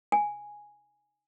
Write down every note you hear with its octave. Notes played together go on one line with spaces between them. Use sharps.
G#5